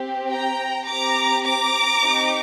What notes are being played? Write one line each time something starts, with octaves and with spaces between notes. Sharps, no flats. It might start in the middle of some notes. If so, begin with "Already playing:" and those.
Already playing: C4 G4
G5 A#5
C4 G4 A#5 D6
A#5 D6
C4 D#4 G4